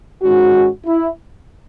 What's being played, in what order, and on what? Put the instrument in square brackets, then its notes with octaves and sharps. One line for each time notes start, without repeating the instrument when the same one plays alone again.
[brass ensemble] G#2 D#3 G#3 C#4 F#4
E4